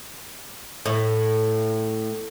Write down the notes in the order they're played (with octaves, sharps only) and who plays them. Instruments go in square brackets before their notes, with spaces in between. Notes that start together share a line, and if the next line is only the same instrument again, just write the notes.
[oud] A2